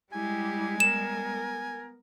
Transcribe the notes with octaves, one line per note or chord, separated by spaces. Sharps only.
G3 G#3 E4 G4 G#5
B3 A#4 E7